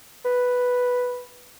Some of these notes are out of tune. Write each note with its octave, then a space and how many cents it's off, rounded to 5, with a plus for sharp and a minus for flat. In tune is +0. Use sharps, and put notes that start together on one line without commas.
B4 +0